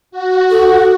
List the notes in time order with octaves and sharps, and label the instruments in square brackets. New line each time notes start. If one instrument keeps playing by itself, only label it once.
[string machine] F#4
[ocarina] A4